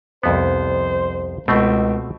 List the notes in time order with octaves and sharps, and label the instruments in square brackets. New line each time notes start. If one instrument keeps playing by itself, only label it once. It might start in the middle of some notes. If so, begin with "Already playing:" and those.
[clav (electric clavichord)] C2 F2 B3 [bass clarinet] C5
[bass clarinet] C#2 [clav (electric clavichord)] B2 A3 C4